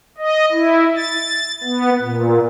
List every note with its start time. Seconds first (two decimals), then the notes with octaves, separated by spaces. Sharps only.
0.18 D#5
0.52 E4
0.97 A6
1.64 B3
2.02 A#2